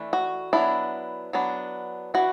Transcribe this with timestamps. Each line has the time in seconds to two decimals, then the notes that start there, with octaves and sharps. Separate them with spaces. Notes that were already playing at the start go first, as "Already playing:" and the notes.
Already playing: E3 A3 D4
0.13 F#4
0.53 F#3 B3 D4 E4
1.33 F#3 B3 D4
2.14 E3 D4 F#4